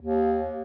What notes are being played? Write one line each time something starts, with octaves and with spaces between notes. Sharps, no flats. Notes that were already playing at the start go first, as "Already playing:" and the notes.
D#2